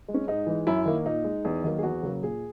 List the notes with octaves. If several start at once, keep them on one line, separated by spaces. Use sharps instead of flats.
G#3
C#4
G#2 D#4
E3 G#3
F#2 E4
D#3 A#3
A#2 D#4
G#3
E2
D#3 F#3 A#3
G#4
E2 F#4
C#3 F#3 A#3
A#2 G#4